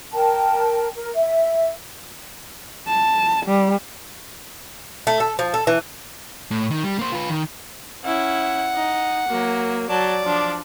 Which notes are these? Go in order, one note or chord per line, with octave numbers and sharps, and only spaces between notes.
A#4 G5 A5
A#4
E5
A5
G3
A3
A4
F3
A4
E3
A2
D#3
G3
A#3 C5
F4 B4
D#3
C#4 E4 F#5
D#4
F#3 A#3
F#3 D5 A5
F3 D4